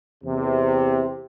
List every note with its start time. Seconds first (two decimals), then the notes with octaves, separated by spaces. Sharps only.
0.24 E2 C3